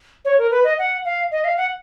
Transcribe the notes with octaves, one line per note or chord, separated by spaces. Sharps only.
C#5
A#4
B4
D#5
F#5
F5
D#5
F5
F#5